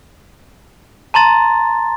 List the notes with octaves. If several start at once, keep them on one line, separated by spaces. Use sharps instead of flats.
A5 A#5 C6 A6